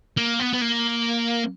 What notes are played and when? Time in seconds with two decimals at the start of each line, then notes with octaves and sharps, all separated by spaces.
0.17 A#3
0.39 B3
0.53 B3
0.61 A#3